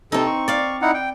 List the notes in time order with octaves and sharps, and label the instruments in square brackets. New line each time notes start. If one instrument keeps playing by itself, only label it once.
[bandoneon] C3 A4 [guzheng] C4 D#4
[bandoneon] C#6
[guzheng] D5 F5
[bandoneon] D#4 E4 F#5
G5